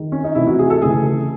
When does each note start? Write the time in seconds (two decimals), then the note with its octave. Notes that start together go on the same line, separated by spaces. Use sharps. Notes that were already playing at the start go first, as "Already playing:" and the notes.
Already playing: D#3 G#3
0.12 C#4
0.24 D#4
0.35 C3 E3 A3 E4
0.47 F#4
0.59 G#4
0.70 A4
0.82 C#3 E3 A3 G#4